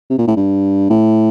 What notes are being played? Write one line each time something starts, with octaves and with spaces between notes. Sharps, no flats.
C3
A#2
A2
G2
A2